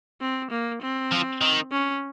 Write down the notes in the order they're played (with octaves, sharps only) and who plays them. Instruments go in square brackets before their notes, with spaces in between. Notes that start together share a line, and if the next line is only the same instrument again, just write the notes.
[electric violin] C4
A#3
C4
[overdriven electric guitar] F3
D#3
[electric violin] C#4